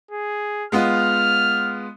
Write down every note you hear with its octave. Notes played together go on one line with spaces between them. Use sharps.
G#4
G#3 B3 F4 F6